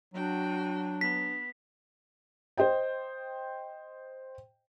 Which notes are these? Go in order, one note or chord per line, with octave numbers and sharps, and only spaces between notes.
F#3 D4 F#4 G5
B3 B6
C5 D#5 G5